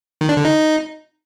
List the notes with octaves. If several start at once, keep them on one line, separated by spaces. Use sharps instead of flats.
D#3
D4
D3
D#4